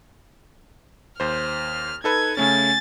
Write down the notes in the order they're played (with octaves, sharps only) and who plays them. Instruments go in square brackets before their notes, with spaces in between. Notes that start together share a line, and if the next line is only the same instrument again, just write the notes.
[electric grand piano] D#2 C5 [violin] F6
[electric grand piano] D#4 A4 B4 [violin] G#6
[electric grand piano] C#3 A3 C#4 [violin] G#5 A6